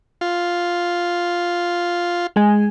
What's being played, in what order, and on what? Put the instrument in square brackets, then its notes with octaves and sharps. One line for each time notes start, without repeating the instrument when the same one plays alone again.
[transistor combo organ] F4
[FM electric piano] G#3 G#5